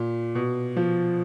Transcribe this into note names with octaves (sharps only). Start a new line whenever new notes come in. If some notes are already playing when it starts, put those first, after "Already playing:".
Already playing: A#2
B2
F3